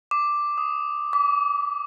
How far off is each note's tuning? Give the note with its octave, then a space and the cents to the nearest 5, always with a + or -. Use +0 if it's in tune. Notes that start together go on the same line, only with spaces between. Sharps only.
D6 +0
D#6 +5
D6 -30